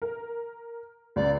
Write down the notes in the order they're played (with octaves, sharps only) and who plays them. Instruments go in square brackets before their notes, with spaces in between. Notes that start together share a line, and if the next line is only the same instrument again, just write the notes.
[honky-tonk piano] A#4
[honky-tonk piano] C#2 [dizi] D5